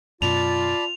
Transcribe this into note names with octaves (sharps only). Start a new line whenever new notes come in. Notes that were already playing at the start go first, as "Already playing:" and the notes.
F#2 B2 F4 D5 A5 B5 F7